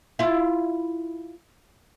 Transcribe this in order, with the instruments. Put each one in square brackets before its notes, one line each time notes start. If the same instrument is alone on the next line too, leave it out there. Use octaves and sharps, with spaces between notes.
[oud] E4 F4